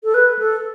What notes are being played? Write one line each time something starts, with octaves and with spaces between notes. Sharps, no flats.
A4
B4
A4